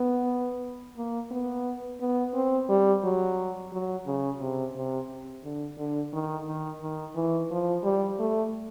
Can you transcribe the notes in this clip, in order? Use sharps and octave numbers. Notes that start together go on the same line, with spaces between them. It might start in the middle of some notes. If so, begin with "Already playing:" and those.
Already playing: B3
A#3
B3
B3
C4
G3
F#3
F#3
C#3
C3
C3
D3
D3
D#3
D#3
D#3
E3
F3
G3
A3